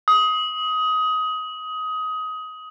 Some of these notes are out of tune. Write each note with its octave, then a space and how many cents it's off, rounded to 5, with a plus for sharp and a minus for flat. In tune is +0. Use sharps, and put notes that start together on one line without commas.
D#6 +20